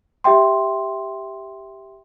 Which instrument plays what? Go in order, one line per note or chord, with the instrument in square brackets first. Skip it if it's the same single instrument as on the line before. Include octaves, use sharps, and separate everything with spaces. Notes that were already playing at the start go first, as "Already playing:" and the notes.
[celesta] G4 E5 G5 C6